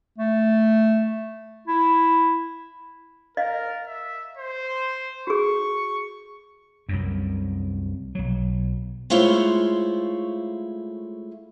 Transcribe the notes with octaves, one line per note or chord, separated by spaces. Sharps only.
A3
E4
A#4 D#5 F5
E5
C5
F#4 G#4 C#6
C2 F#2
B1 F#3
G#3 A3 E4 F4 C5 C#5